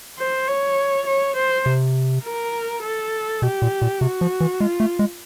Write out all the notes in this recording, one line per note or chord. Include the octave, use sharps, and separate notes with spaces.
C5
C#5
C#5
C5
C3
A#4
A4
B2 G4
A#2
A#2
C3 F#4
F3
E3
G#3 F4
A3
G#3